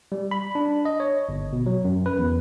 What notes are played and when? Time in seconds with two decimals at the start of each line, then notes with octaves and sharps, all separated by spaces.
0.12 G3
0.31 B5
0.55 D4
0.85 D#5
1.00 C#5
1.29 G1
1.53 B2
1.66 F#3
1.85 F#2
2.06 B4
2.18 E2